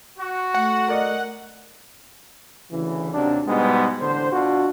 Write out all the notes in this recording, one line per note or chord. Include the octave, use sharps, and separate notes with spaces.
F#4
A3 F#5
A#4 D5 D#5
D2 C#3 E3
D#2 C3 F#3 D4
G#2 B2 G3 G#3 B3
A1 D3 C5
B2 D4 F4 F#4